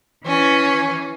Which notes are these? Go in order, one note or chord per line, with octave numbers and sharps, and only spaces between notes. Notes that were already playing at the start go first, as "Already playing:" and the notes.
E3 C#4